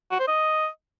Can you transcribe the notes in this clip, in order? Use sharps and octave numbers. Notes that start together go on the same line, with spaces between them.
F#4
C5
D#5